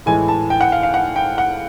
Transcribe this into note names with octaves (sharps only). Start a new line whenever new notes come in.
A2 E3 G#3 G#5
A5
G5
F#5
F5
F5
F#5
G5
F#5